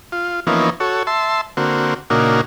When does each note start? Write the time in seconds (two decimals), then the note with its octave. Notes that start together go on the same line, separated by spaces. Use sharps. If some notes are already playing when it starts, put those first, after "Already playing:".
0.12 F4
0.47 E3 F3 A#3 B3 C#4 D#4
0.80 F#4 A4 C#5
1.07 E5 A5 C6
1.57 D3 A#3 C4 F#4
2.10 A#2 C#3 A#3 D4 D#4 F#4